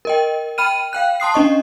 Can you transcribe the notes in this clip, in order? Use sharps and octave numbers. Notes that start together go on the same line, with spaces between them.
A#4 D#5 G5
G5 B5 F6 D#7
F5 G5 F#6
A5 C6 D#6 C7
C#4 D4 D#5 C#6